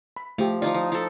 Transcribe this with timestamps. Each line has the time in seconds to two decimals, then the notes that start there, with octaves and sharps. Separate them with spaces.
0.17 B5
0.38 F3 A3 G4
0.62 F3 D#4 F4 D5
0.74 F3
0.92 F3 A4